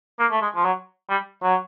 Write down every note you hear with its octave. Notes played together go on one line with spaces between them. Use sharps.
A#3
A3
G#3
F3
F#3
G3
F#3